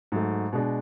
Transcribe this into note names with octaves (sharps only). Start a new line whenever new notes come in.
G#2 F#3 A3
B2 G#3 D4